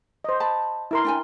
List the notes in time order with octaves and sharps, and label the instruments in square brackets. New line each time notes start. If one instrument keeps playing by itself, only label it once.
[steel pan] C5 D#5
[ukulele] A5 B5
[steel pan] E4 A#4 C6
[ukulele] D4 G5 G#5